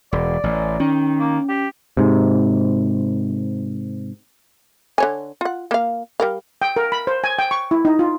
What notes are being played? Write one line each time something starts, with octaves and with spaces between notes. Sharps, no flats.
E1 D5
A1
D#3 C#4
A#3
G4
G#2 C3
D3 C#5 G#5
F4 F#5
A#3 F5
G3 A#4 F5
G5
A#4
B5
C5
G#5
G5
C#6
E4
D#4
F4